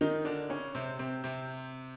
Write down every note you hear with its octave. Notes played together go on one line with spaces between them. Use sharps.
D#3 D#4
D3 D4
C#3 C#4
C3 C4
C3 C4
C3 C4